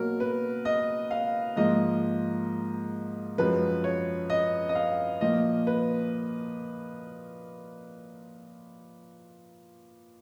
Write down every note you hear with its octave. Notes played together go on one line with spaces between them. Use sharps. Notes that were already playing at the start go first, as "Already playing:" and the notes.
Already playing: B2 F#3 A#3 A#4
B4
D#5
F5
G#2 F3 A#3 D#5
F#2 F3 G#3 B4
C#5
D#5
D#5
F5
A#2 F3 A#3 D#5
B4